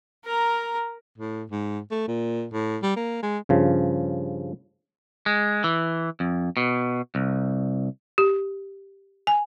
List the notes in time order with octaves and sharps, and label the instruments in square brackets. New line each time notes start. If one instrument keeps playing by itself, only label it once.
[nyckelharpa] A#4 A#5
[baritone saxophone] A2
G#2
A3
A#2
A2
G3
A#3
G#3
[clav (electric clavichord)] G2 C#3 F3
[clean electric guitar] G#3
E3
F2
B2
C2
[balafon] G4
G#5